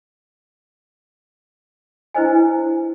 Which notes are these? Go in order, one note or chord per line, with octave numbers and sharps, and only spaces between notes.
D4 E4 B4 C5 D#5 G#5